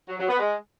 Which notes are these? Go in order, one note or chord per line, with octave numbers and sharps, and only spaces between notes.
F#3
F#3
B3
G#3